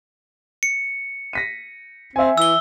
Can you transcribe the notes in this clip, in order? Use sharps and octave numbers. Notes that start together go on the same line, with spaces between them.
C#7
A#6 B6 D#7
C4 E5 G#5
E3 E6 G7